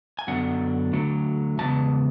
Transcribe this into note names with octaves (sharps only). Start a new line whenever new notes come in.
G#5
F#2 D3 F#3 B3 D4 F#5
D3 F#3 A3 D4
E2 C#3 G#3 B3 A5